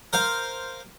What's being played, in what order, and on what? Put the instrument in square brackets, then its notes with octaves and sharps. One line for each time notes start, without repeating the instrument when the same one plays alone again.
[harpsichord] A#4 C5 F5